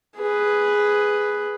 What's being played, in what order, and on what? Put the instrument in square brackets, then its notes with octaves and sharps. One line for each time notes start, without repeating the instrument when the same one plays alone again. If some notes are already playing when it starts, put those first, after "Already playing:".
[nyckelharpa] G#4 B4